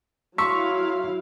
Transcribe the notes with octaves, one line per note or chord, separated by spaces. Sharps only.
F#3 E4 F5 C6 C#6 E6 B6